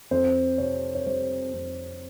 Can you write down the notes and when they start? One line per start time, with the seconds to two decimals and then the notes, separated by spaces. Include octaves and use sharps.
0.11 F2 C5
0.58 C3 C#5
0.95 C#5
1.06 G3 C5
1.53 F2